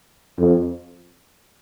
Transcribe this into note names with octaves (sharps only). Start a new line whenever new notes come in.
F2